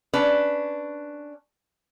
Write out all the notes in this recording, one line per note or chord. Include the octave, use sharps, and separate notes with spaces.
C#4 D4 B4